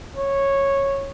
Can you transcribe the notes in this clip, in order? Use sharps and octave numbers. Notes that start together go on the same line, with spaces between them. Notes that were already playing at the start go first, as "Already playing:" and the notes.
C#5